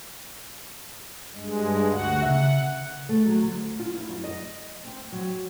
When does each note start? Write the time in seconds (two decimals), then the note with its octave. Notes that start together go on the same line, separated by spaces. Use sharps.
1.34 G2 G#3
1.90 D2 F#4 F#5
2.22 C#3 E5 F#5
3.09 A3
3.26 F#3
3.40 D2
3.79 F4
3.95 E4
4.08 F#2
4.24 D#5
4.85 C4
5.12 F#3